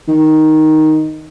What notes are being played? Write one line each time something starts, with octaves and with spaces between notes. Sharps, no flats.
D#3